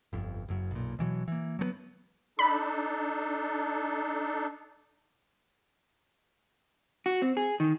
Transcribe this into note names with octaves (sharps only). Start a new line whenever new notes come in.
G1 F2
F#1 F#2
B1 A#2
B2 E3 F#3
E3 A#3
F#3 A3 B3
D4 D#4 A4 B5
F#4
C4
G#4
D#3